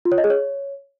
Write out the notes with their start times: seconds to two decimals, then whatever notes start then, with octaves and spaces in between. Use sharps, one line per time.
0.05 F4
0.12 C#5
0.18 D#5
0.24 G#4
0.30 C#5